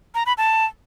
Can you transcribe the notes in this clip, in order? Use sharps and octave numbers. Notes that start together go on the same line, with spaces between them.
A#5
B5
A5